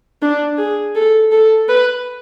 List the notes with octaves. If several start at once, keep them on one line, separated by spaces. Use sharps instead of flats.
D4
G#4
A4
A4
B4